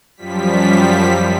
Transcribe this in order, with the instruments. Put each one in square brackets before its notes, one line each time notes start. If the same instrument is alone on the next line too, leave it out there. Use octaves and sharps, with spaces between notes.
[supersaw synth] F#2 F3 G3 B6